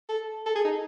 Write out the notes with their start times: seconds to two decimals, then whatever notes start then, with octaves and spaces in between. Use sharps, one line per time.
0.09 A4
0.46 A4
0.55 G#4
0.64 D#4